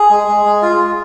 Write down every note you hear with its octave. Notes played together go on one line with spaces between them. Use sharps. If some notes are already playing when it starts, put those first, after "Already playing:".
Already playing: G#4
G#3
G#3
G#3
F4
G#3